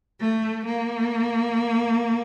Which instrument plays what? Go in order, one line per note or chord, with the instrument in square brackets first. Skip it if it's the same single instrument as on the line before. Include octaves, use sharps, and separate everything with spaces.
[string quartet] A3
A#3